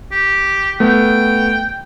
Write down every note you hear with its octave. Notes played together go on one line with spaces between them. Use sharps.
G4
A3 B3 G5